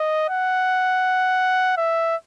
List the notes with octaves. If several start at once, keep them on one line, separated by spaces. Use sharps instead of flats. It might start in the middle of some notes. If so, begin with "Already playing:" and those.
Already playing: D#5
F#5
E5